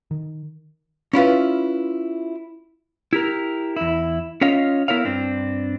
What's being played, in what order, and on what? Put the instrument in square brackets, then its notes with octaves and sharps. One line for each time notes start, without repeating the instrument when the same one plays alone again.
[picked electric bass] D#3
[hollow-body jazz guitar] C#4 E4 F4 B4
[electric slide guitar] E4 G4 A#4
E2 E4
C#4 F4 C#5 D#5 F5
B3 E4 A#4 C#5 F5
G2 C4 D4